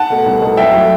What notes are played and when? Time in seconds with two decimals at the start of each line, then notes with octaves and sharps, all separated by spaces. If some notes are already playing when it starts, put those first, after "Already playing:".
Already playing: F#5 A5
0.10 B2 A3
0.26 C2
0.41 B2 A3
0.57 F#1 E5 G5
0.73 F#3 A3